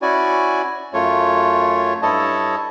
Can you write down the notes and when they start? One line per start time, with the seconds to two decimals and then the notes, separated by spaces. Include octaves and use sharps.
0.02 C#4 E4 F#4 D5 G#5
0.94 F#2 A3 F4 C#5
2.02 G2 E4 A4 C#5 D#5 A5